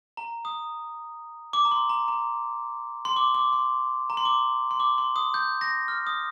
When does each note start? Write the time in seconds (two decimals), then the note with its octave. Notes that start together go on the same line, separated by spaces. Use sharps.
0.17 A#5
0.45 D#6
1.53 D6
1.65 A#5
1.72 C6
1.89 A#5
2.08 A#5
3.05 C6
3.16 D6
3.34 D6
3.53 C6
4.10 A#5
4.17 C6
4.25 D6
4.71 C6
4.80 D6
4.98 C6
5.16 D#6
5.34 G6
5.61 A#6
5.88 F6
6.07 D#6